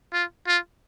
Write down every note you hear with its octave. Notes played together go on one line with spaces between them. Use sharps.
F4
F4